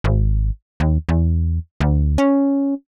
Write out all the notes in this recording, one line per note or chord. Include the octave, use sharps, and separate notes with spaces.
G#1
D#2
E2
D2
C#4